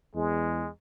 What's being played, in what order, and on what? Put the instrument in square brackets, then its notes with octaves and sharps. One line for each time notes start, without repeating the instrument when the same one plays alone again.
[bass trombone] E2 [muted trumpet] G#3